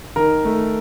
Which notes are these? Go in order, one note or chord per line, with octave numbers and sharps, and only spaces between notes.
D#3 A#4
A3